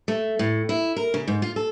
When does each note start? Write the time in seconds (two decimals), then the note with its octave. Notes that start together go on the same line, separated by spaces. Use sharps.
0.08 A3
0.39 A2
0.69 E4
0.96 A#4
1.14 C#3
1.28 G#2
1.42 F4
1.56 A4